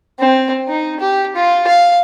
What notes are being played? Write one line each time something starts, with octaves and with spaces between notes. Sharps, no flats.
C4
D#4
G4
F4
F5